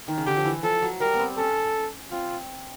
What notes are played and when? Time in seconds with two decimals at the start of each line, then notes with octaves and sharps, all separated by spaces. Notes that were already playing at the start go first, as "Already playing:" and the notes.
0.08 D#3
0.17 C#3
0.26 D3 G4
0.37 F3
0.45 E3
0.63 F3 A4
0.82 F#3
1.00 G3 A#4
1.14 B3
1.19 C4
1.38 C#4 A4
2.12 C4 F4